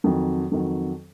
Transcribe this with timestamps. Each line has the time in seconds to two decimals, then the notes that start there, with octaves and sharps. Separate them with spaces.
0.04 F2 D#3 F#3
0.51 F2 D#3 F#3